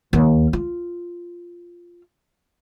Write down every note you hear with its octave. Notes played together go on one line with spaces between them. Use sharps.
D#2
F4